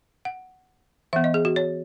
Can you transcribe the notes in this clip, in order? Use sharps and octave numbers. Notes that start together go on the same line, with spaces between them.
F#5
E3 B3 E5
D#5
G#4
F#4
C#5